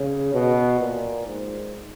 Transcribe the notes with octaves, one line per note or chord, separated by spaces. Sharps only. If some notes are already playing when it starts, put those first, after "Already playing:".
Already playing: C#3
B2
A#2
G#2